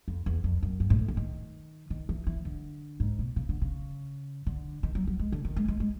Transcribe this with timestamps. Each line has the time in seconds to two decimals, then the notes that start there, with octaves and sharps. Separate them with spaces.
0.08 F2
0.26 E2
0.44 F2
0.63 F#2
0.80 G2
0.90 G#2
0.99 A2
1.08 D3
1.17 D#3
1.90 D#3
2.09 E3
2.27 E3
2.45 D3
3.00 G#2
3.19 B2
3.36 C#3
3.49 D3
3.62 C#3
4.47 D3
4.83 D#3
4.95 F#3
5.07 F#3
5.19 G#3
5.32 D3
5.45 D#3
5.56 G#3
5.68 G#3
5.80 G#3